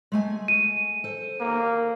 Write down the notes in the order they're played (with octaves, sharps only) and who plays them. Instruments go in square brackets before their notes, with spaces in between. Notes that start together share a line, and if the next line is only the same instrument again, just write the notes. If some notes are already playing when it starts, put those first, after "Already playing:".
[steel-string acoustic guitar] G#3 A3 G#5
[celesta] D#7
[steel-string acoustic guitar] A4 C5
[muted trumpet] A#3